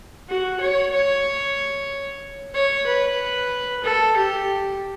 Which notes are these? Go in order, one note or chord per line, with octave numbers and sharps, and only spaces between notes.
F#4
C#5
C#5
C#5
B4
A4
G4